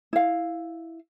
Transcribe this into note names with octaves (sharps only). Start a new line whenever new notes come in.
E4 F5